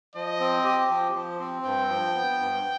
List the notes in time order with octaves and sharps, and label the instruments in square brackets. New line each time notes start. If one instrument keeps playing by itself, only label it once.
[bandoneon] F3 [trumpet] D#5
[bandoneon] C4
G4
F3
F3
C4
[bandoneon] G2 [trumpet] G5
[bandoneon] F3
B3
G2